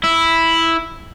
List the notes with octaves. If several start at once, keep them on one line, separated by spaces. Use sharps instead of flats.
E4